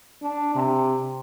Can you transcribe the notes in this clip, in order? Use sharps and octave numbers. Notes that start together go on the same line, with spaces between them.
D4
C3